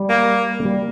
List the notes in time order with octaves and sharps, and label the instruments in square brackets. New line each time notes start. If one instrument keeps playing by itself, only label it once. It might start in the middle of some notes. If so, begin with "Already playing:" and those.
Already playing: [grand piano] G3
[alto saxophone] A#3
[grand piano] A#3
G3